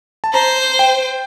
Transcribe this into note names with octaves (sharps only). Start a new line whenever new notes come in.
A5
C5 A#5
G5